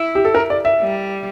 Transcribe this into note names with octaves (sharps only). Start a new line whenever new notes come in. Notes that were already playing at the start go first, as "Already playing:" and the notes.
Already playing: E4
G4
A4
A#4
D5
E5
G3